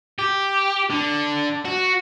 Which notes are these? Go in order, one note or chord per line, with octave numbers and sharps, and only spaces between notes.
G4
D3
F#4